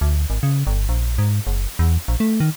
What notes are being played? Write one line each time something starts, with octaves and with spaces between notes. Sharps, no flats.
D2
G#1
C#3
G1
A#1
G#2
F#1
E2
A#1
A3
D#3